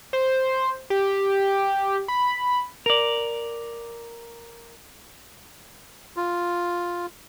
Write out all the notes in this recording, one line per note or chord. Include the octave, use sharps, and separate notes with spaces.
C5
G4
B5
A#4 D5
F4